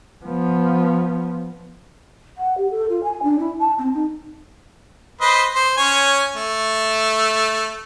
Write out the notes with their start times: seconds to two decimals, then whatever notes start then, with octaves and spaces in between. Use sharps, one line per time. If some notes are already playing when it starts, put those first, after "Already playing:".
0.25 F3 B3
2.38 F#5
2.58 G4
2.71 A4
2.90 F4
3.04 G#5
3.23 D4
3.39 E4
3.59 A5
3.79 C4
3.94 D#4
5.21 B4 C5 D#5
5.55 C5
5.77 C#4 C#5 G#5
6.36 A3